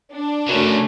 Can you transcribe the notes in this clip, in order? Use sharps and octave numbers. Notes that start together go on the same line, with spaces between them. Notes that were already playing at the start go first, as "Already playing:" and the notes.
D4
F#2 C#3 E3 A3 C#4